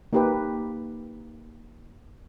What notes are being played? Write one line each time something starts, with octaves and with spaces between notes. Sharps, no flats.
A#3 D#4 G4 B4